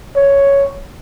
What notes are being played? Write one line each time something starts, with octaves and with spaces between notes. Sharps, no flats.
C#5